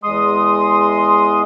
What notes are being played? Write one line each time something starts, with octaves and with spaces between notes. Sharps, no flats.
E2 G#3 C6 D#6